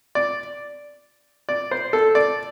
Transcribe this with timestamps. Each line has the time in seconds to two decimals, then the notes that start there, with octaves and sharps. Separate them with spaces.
0.15 D5
1.49 D5
1.71 C5
1.93 A4
2.15 D5